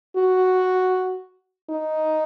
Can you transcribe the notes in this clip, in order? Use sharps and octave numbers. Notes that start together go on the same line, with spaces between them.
F#4
D#4